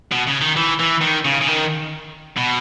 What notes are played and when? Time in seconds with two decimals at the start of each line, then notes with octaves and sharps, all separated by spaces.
0.11 B2
0.27 C#3
0.41 D#3
0.56 E3
0.80 E3
1.01 D#3
1.25 C#3
1.41 C#3
1.48 D#3
2.37 B2